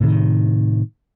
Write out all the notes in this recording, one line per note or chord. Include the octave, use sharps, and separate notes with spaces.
A2 C3 D#3